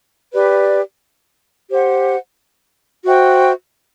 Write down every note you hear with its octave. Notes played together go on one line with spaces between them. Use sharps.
G4 B4 D5
G4 C5 F#5
F#4 C5 E5 G5